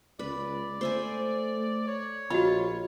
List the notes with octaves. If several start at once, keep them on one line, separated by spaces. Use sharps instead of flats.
C#2 B4 D5
A3 C5 E5 G#5
C#5
A#1 F4 F#4 D#5 B5